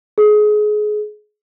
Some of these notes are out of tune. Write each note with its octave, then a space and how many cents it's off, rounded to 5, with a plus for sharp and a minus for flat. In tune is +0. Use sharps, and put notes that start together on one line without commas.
G#4 +25